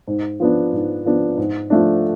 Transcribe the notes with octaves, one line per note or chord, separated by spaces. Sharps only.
G#2
F3 B3 D4
G#2
F3 B3 D4
G#2
F3 A3 D4